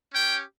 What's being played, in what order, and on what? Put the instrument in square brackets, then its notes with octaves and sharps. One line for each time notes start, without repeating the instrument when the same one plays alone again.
[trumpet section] C#4 G4 G5